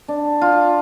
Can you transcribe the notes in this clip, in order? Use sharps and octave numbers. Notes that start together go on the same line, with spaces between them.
D4
F4